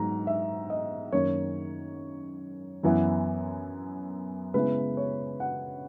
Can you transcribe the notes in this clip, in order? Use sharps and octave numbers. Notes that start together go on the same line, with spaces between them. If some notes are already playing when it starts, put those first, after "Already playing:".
Already playing: G#2 F#3 B3 A#5
E5
D#5
F#2 D#3 A#3 C#4 C#5
F#2 E3 B3 E4
C#3 G#3 B3 E4 B4
C#5
F#5